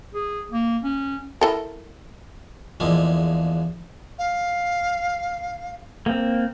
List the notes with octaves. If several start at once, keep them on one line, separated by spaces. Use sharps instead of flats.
G#4
A#3
C#4
E4 A4 A#4
E2 D3 F3 G#3 A#3
F5
A#3 C4